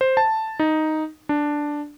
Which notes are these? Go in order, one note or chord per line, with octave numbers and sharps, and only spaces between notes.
C5
A5
D#4
D4